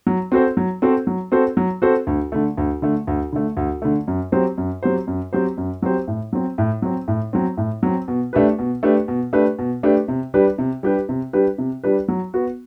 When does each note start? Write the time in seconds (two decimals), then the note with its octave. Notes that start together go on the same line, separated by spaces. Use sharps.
0.07 F#3
0.32 C4 F#4 A4 C5
0.57 F#3
0.82 C4 F#4 A4 C5
1.07 F#3
1.32 C4 F#4 A4 C5
1.57 F#3
1.82 C4 F#4 A4 C5
2.07 D2
2.32 D3 A3
2.57 D2
2.82 D3 A3
3.07 D2
3.32 D3 A3
3.57 D2
3.82 D3 A3
4.08 F#2
4.32 F#3 C4 G4 C5
4.58 F#2
4.83 F#3 C4 G4 C5
5.07 F#2
5.33 F#3 C4 G4 C5
5.57 F#2
5.82 F#3 C4 G4 C5
6.08 A2
6.33 F#3 C4
6.58 A2
6.82 F#3 C4
7.08 A2
7.33 F#3 C4
7.57 A2
7.83 F#3 C4
8.08 B2
8.33 A3 D4 G4 B4
8.59 B2
8.83 A3 D4 G4 B4
9.08 B2
9.33 A3 D4 G4 B4
9.59 B2
9.83 A3 D4 G4 B4
10.08 C3
10.34 G3 D4 G4 B4
10.58 C3
10.83 G3 D4 G4 B4
11.09 C3
11.33 G3 D4 G4 B4
11.58 C3
11.83 G3 D4 G4 B4
12.08 F#3
12.34 B3 F#4